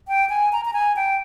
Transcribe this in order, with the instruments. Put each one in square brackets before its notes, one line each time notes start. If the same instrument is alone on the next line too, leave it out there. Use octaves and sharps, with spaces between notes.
[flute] G5
G#5
A#5
A#5
G#5
G5